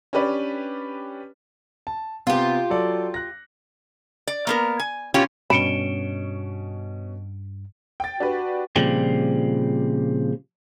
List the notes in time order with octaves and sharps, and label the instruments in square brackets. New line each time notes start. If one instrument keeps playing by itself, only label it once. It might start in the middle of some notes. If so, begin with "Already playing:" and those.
[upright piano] C#4 D4 G4 B4 D5
[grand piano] A5
[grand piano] C3 B3 [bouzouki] F4 G4
[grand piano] F#3 A4 D5
F#6 A#6
[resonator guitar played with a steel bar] D5
A#3 B3 A#4
G#5
B2 C#4 F4 G4
[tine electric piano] G2 [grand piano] B2 C#4 G7 [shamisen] B5 [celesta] C#7 D7 E7
[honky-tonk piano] G5 A6
[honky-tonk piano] D4 G4 B4 [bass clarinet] F#4
[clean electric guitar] A#2 C#3 F3 G3 C4